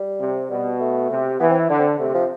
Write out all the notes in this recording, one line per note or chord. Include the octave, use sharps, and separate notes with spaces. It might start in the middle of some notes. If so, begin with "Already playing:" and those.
Already playing: G3
C3
B2 G3
A3
C3
E3 B3
C4
E4
D3 D4
C4
C3 A3
F3